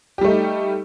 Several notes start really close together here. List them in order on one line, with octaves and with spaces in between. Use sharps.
G4 G3 A3 D#4